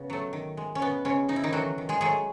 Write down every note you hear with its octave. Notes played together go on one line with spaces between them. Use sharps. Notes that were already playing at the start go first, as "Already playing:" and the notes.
Already playing: C#3 B3
F#3 A3
D#3
G#3
C#4
B2 B3
C#3 G#3 C#4
C#3 D#4
E4
D#3 D#4
E3 F#3 A3 F#4
D#3
G#3 G#4
F#3 G#3 A3 G#4